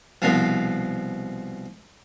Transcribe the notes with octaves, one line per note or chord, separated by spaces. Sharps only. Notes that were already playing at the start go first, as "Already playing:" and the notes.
C2 B2 F3